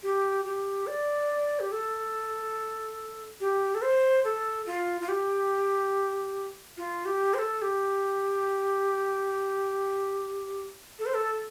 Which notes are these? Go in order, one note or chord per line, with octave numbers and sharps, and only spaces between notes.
G4
G4
D5
G4
A4
G4
A4
C5
A4
F4
F4
G4
F4
G4
C5
A4
G4
A4
C5
A4